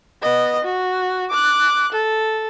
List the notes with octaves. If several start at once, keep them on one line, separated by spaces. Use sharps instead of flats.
B3 D#5
F#4
D6 F#6
A4